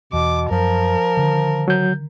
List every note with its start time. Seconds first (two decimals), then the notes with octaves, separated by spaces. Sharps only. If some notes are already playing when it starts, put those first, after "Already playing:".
0.13 E2 B2 D6
0.51 F#2 F3 A#4
1.17 D3 D#3
1.68 F#3 G6